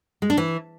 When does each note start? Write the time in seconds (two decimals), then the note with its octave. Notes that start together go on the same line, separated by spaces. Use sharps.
0.22 G#3
0.30 D4
0.37 E3